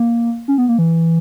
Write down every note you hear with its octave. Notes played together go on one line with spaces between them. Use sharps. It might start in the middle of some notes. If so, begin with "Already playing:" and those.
Already playing: A#3
C#4
B3
A#3
E3